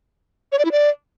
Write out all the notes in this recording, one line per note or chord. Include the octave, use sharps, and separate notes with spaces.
C#5
D5
E4
D5